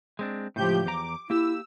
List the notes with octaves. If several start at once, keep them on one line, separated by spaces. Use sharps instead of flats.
G#3 C4 D4
C#2 A2 F3 G4 G6
E2 A#5 D6
A#3 E4 G4 E6